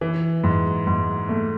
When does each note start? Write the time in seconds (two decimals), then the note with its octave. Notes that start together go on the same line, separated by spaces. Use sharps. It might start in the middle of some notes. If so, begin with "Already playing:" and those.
0.01 E3
0.44 G#2
0.87 G#2
1.29 A3